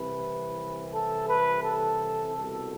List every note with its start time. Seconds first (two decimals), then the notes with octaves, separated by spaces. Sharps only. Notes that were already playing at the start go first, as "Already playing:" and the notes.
Already playing: C2 C3 E3 B4
0.93 A4
1.28 B4
1.64 A4
2.35 C2 B2 A4